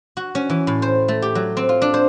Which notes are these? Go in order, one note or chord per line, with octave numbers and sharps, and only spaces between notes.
F#4
C#4
E3
A2
C5
A3
G4
F#3
C4
F4
D4
C5